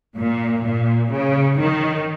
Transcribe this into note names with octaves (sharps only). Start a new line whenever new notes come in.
A#2
A#2
C#3
D#3